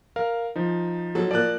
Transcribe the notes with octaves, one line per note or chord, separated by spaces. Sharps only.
A#4 F5
F3 D#4
F#3 A4
F3 A#3 D5 F#6